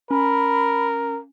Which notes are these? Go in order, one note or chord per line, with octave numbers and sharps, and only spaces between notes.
C#4 A#4 B5